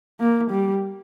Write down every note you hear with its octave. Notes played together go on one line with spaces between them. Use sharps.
A#3
G3